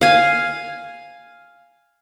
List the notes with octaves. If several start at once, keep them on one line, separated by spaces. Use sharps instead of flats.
F5 G#5